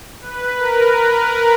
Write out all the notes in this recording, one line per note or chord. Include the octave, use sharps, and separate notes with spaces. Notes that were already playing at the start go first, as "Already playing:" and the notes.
B4
A#4